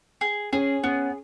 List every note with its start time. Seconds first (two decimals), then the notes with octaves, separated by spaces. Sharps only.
0.21 G#4
0.53 C#4 G#4
0.84 B3 C#4